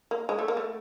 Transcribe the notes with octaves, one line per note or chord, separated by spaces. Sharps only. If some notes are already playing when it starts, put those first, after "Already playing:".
A#3
G#3
A3
A#3
A3